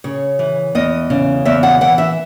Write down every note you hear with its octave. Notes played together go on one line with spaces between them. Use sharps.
C#3 C#5
E3
E2 D#5
C#3
E2 E5
F#5
E3 F#5
E5